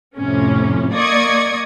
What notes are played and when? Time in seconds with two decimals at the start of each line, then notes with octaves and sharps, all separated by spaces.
0.17 F2 A2 C3 C#4
0.92 A#3 D5 D#5 C#6 D#6 G#6